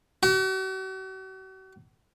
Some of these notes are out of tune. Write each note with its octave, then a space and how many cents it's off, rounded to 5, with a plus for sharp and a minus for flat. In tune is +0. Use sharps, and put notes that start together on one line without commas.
F#4 +45